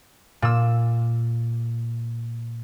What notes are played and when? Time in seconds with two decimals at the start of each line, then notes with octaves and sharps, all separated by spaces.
0.42 A#2 E6